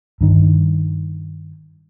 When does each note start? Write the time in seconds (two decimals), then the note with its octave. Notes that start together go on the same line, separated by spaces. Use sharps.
0.21 G2 D#3